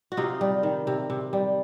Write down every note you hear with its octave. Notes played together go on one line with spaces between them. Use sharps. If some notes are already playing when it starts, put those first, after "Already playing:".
F#4
C3 D#4 F4
G3
D#3
C3
C3
G3